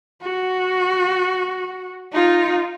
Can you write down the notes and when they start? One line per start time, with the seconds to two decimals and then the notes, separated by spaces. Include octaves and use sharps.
0.21 F#4
2.12 D#4 F4